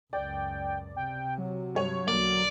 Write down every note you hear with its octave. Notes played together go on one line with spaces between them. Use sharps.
C#2 F#2 D5 G5
C3 G5
F#3
G2 C#5 F7
B1 D3 A#3 D5